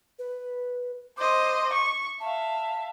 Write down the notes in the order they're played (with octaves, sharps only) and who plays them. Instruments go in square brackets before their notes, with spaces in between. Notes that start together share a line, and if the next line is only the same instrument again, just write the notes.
[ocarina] B4
[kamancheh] C5 D#5 [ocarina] D6
[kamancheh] C#6
[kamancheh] E5 F5 [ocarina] A5